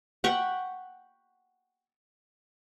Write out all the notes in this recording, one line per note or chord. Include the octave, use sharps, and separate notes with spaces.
F#5 G5 B5 C#6